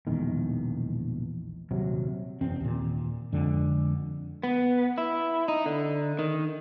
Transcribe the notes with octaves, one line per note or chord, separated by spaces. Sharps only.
E1 A#1 E2 D#3
D#1 C3 F#3
F#1 E2 C3 C4
D#2 A#2
F2 D3 G#3
B3
E4
D#4
D3
D#3